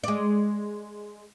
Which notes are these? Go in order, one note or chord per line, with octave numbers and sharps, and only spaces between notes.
G#3 D5